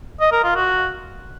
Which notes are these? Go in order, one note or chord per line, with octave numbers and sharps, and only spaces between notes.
D#5
A#4
F4
F#4